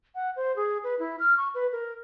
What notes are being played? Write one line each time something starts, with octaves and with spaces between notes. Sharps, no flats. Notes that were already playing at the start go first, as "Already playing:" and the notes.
F#5
C5
G#4
B4
E4
F6
C#6
B4
A#4